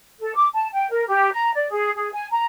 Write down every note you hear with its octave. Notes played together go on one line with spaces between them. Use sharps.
A4
D6
A5
G5
A#4
G4
A#5
D5
G#4
G#4
G#5
A#5